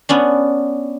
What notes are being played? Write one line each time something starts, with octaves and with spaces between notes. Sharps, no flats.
B3 C#4 D4